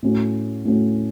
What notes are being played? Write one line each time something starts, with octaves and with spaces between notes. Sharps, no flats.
A2 A3 C#4 F#4
A2 A3 C#4 F#4